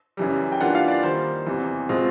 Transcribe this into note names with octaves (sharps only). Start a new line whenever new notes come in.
F#2 C#3 E3 G3
G5
E3 G3 A#3 D4 F4 F#5
F5
D5
D#3 G3 A#3 C5
E2 C3 E3 G3
B2 G#3 C4 F4